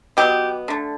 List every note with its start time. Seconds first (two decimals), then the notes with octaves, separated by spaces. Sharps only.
0.17 B2 F#3 B3 G4
0.68 D3 A3